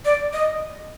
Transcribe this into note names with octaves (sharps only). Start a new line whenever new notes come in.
D5
D#5